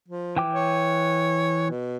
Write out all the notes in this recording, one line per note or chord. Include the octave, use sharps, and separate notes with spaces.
F3
E3 G5 D6
C#5
B2